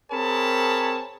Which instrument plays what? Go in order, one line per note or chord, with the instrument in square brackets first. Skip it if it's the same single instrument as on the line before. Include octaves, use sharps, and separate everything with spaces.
[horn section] C4 G#4 A#4 C#5 A5 B5